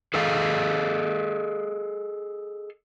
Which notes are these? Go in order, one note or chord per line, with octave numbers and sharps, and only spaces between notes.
G#4 A4 D#5 F5